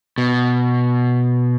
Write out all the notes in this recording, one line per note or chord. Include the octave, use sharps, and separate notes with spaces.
B2